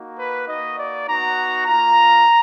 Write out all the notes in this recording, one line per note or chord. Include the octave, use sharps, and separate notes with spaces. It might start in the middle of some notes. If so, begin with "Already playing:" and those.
Already playing: A#3 D#4 F#4
B4
A#3 D#4 F#4 D#5
D5
B3 D#4 F#4 A#5
A#3 F4 A#5